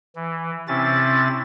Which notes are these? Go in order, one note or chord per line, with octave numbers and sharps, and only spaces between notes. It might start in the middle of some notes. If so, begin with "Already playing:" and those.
E3
C3 C4 C#4 E4 A6